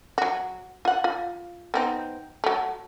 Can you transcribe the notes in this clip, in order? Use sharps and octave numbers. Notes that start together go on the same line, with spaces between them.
F#3 F#4
F4 F#5
F4
B3 C4 D#4
F#3 A3